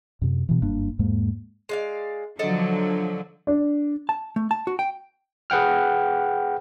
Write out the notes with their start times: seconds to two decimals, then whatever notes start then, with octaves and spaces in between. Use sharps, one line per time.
0.22 F#2 C3
0.49 B2 E3
0.62 F#1 G2 A#3 D4
0.99 E2 G#2 G#3 A#3
1.69 G#3 D5 F5
2.39 D3 F3 F#3 A4 D5 D#5
3.47 D4
4.09 A5
4.36 A3
4.51 A5
4.67 F#4
4.79 G5
5.50 G#4 B4 F#5 G5 F6